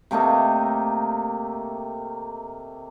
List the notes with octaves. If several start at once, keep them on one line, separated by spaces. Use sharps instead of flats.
C3 A3 A#3 D#4